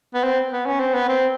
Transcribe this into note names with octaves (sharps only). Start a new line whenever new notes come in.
B3
C4
B3
C#4
C4
B3
C4